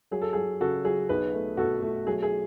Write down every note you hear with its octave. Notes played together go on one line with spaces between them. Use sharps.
F#3 G#4
A4
F#3 G#4
C#3 F#4 A4
F#3 G#4
B1 G#4 B4
A3
B2 F#4 A4
A3
F#3 G#4
G#4